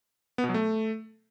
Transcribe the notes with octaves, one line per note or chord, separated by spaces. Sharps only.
B3
B2
F#3
A3